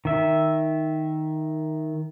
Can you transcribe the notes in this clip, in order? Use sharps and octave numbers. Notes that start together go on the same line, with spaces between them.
D#3 E5